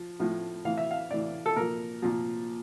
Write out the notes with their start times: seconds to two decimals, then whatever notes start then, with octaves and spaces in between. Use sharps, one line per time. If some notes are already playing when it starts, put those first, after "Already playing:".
Already playing: F3
0.19 A2 F3
0.65 A2 E3 F5
0.77 E5
0.91 F5
1.11 A2 E3 D5
1.46 A4
1.56 A#2 F3 A#4
2.02 A#2 F3